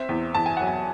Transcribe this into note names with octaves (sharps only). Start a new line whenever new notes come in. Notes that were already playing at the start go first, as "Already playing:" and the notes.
Already playing: C4 E5
E2
E2 A5
G#5
F#3 F#5
G#5